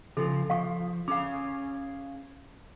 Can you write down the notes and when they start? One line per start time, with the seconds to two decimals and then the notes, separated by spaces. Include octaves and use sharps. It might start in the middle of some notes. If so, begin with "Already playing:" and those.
0.17 C#3 F3 A4
0.50 F3 F5 C#6
1.08 C#4 G#4 F5 D6